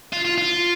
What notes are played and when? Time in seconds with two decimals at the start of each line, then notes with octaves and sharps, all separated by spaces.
0.13 F4
0.25 F4
0.38 F4